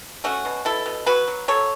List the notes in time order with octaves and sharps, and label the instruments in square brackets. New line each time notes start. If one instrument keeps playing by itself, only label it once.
[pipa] A3 C#4 F#4
B2
B2 E4 A4
B2
F#3 F#4 B4
F#3
F#3 A4 C#5